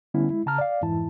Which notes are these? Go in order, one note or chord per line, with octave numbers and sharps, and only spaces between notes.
D3 G3 B3 C#4 E4
G#3 E4
C#3 A5 A#5 F6
D5 F5
F2 G#2 E3 E4 A5